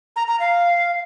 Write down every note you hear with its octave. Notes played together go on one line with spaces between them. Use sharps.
A#5
A#5
F5